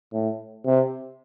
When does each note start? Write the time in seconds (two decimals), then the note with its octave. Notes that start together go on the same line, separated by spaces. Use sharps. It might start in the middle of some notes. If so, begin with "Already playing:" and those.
0.13 A2
0.66 C3